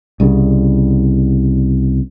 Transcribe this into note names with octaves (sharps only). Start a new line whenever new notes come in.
C2 C#3